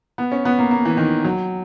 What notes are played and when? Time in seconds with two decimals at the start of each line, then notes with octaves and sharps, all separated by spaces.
0.18 B3
0.32 C#4
0.45 B3
0.59 A#3
0.71 A#3
0.85 E3
0.97 D#3
1.24 F#3